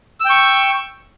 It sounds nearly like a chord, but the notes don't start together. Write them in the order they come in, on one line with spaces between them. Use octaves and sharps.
E6 G5 C#6